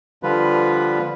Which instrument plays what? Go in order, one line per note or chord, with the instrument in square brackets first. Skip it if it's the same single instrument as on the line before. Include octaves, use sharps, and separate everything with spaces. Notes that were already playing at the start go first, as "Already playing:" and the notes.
[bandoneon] D3 F3 G3 F4 B4